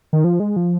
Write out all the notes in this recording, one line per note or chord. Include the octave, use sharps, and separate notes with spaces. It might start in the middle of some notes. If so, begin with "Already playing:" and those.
D#3
F3
G#3
F3